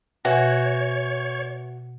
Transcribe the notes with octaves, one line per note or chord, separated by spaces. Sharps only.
B2 F#4 B4 C#5 E5 G#5